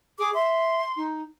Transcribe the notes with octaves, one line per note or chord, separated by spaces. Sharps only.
G#4 D6
E5 C6
D#4